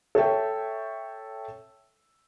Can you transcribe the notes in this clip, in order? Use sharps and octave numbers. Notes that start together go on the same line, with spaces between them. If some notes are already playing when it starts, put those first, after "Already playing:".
A4 C#5 E5 G5